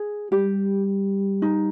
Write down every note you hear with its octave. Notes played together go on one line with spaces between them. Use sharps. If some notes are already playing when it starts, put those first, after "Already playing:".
Already playing: G#4
G3 G4
D#4